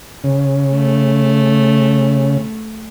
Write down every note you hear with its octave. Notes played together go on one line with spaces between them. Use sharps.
C#3
A3